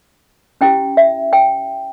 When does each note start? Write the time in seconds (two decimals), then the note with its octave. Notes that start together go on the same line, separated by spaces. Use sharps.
0.61 C#4 E4 G4 G5
0.97 E5
1.33 G5